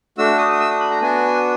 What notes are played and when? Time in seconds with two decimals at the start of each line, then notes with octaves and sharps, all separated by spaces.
0.18 A3 D4 F#4 E6
0.38 D#6
0.52 D#6
0.60 E6
0.71 D#6
0.80 B5
0.91 A#5
1.01 B3 D4 F#4 G#5